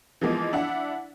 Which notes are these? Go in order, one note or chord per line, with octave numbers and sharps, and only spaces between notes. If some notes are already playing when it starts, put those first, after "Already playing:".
E3 F3 G#3 A#3 B3
D4 E4 F#5